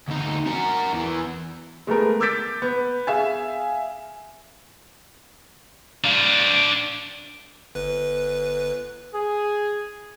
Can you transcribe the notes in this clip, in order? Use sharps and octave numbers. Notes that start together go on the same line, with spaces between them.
D2 D#4
F#4 A#4
E2 E3
G#3 A3 B3 A#4
D6 E6 G6 A6 B6 D7
B3
G#4 E5 F5 G#5
D4 F5
G1 B4
G#4